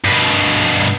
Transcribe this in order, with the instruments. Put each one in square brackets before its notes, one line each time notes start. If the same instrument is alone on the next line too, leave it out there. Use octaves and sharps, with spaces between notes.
[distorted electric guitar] G2 B2